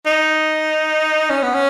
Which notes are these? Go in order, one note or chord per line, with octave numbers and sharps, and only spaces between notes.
D#4
C#4
B3
C#4